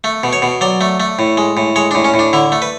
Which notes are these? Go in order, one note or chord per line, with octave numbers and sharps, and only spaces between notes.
A3
B2
C#5
B2
F#3 D5
A3
A3
A2
G#3
A2
G#3 C#5
A2 D4
C#4
A2
D4
D3 E4
A3
B4